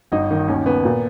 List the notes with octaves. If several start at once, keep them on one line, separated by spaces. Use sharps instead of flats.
G1 D#4
D#3
D#2 C#4
C#3 B3
A#2